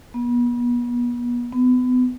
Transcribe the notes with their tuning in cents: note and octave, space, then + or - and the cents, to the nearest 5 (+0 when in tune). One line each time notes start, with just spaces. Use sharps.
B3 -35
B3 +30